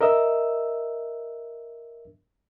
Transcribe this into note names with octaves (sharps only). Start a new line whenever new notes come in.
A#4 D#5 E5 E6